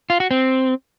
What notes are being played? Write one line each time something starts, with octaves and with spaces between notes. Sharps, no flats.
F4
F#4
C4